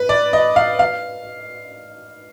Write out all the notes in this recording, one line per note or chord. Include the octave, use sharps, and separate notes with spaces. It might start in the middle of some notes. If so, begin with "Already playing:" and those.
Already playing: B4
D5
D#5
F5
F5